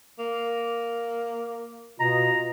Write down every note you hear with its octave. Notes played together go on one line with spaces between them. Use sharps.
A#3
B2 F4 D#5 A#5